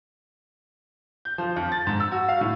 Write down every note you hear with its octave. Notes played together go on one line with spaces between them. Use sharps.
G6
F3
F2
A6
G#2
E6
F#4
F5
A2